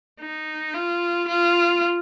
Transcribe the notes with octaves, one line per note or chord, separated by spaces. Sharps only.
D#4
F4
F4